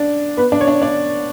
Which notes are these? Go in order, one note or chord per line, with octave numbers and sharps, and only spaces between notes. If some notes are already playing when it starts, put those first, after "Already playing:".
Already playing: D4 D5
B3 B4
D4 D5
C#5
D4 D5
D4 D5